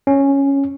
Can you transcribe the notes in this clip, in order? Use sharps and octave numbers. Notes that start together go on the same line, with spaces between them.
C#4